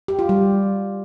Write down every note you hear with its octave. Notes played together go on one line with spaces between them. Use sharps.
G4
F4
G3